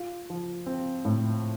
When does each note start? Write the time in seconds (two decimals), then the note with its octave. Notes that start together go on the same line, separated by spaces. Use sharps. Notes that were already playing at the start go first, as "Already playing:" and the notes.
Already playing: F4
0.30 F3
0.66 C4
1.05 A2